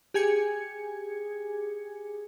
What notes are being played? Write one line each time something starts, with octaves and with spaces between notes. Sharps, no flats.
G4 G#4 G#5 G#6 C#7